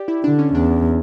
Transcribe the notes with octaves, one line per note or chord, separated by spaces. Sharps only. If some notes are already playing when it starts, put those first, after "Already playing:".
Already playing: G4 D5
E4
D3 D4
C#4
E2 D4